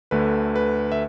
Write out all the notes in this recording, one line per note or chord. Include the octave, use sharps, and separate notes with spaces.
D2 D3 A3 B4
B4
E5